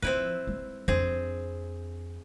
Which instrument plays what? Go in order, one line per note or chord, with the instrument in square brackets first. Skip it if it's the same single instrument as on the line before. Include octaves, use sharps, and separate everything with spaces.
[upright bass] F3 [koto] C4 E4 B4
[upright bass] G#3
[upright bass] F2 D4 [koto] C4 G#4